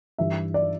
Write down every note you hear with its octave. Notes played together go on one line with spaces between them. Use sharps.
G2 E3 G3 E5
D5